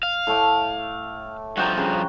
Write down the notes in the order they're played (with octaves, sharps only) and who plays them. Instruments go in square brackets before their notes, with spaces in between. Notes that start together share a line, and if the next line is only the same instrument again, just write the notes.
[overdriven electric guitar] F5
[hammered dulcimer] A2 A3 D6
[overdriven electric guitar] G2 F3 [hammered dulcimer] F#4 G5 A#5
[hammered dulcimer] C#3